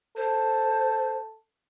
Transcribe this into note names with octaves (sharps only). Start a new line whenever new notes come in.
A4 C5